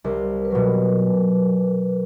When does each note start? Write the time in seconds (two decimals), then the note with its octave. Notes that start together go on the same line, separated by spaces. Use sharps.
0.04 C2 A#4
0.45 B4
0.51 B2 F#3 A#4